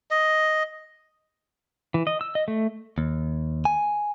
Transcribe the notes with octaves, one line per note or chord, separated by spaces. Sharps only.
D#5
E3
D#5
E6
D#5
A3
D#2
G#5